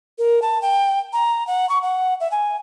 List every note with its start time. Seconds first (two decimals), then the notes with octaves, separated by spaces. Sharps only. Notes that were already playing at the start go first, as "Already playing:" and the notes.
0.18 A#4
0.42 A5
0.62 G5
1.13 A#5
1.47 F#5
1.69 C#6
1.83 F#5
2.20 E5
2.31 G#5